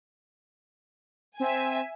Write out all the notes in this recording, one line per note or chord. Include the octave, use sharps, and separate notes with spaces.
C4 E5 G#5